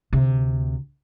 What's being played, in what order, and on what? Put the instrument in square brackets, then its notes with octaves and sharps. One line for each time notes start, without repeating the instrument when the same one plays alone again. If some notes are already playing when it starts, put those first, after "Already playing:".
[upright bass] D2 C3